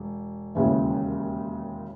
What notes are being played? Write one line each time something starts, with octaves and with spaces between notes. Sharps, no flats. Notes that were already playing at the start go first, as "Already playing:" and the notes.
Already playing: E1
E1 D#2 C#3 E3